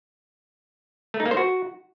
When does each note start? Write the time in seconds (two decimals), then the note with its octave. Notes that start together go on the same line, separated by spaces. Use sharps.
1.14 A3
1.20 D#4
1.26 A#3
1.31 C5
1.37 F#4